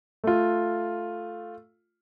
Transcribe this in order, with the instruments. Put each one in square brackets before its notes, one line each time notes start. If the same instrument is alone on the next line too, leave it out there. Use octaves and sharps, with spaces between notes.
[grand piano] A3 F4